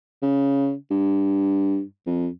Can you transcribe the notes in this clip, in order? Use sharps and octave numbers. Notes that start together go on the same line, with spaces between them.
C#3
G2
F2